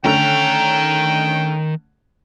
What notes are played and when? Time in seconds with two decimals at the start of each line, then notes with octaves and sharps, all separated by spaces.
0.04 D3 D#3 A3 C#4 G5 A#5